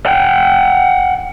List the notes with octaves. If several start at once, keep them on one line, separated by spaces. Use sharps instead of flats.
F#5 G5